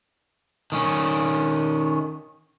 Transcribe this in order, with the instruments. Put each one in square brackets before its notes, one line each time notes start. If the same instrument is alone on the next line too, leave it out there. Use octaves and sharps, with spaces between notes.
[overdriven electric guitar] D#3 C#4